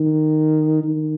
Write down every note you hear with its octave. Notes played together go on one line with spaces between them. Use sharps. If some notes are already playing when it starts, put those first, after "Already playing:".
Already playing: D#3
D#3